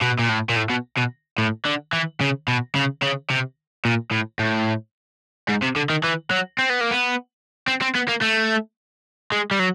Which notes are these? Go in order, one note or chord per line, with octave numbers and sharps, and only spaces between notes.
B2
A#2
A2
A#2
A2
B2
B2
A2
D3
E3
C#3
B2
C#3
C#3
C3
A#2
A2
A2
G#2
C3
D3
D#3
E3
F#3
C4
B3
A#3
B3
C4
C4
B3
A#3
A3
G#3
G3
F#3